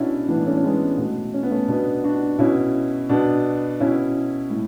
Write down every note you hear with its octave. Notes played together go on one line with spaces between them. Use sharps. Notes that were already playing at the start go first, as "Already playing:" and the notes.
Already playing: B2 C#4 D4 E4 F#4
A2 E3 B3 D4
A3 C#4
C#4
G#3 B3
B2 A3
C#4
B3
A3 C#4
B2 B3 D4
D4 F#4
B2 C#4 E4
B2 B3 D4
B2 C#4 E4
A2